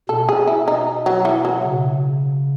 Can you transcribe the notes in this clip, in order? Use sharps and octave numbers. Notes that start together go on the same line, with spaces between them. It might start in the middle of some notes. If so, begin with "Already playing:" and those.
B2 A4
G#4
E4
D#4
F#3
E3
F#3
C#3